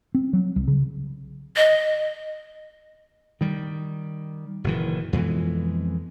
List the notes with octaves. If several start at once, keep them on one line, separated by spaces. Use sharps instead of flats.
C4
F#3
C2
C#3
D#5
D#3 G3
F#1 A#2 D#3 E3
F2 B2 E3 G#3